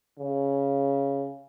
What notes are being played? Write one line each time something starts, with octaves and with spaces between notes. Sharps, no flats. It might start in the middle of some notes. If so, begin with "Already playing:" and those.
C#3